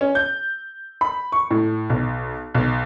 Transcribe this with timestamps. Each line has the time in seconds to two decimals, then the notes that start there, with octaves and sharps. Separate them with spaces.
0.01 C#4
0.15 G6
1.01 B5
1.32 C#6
1.51 A2
1.90 B1
2.55 B1